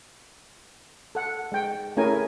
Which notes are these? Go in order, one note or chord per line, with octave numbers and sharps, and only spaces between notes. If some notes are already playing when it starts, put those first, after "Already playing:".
A4 F#5
G#3 G5
A3 C#4 E4 G#4 A#4 G#5